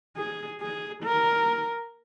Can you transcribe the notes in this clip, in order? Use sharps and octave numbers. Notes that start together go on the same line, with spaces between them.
G#4
G#4
A#4